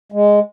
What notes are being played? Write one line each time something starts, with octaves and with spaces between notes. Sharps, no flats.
G#3